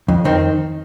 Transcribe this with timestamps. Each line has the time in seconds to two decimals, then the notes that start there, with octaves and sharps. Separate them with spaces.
0.08 F2
0.25 D#3 C4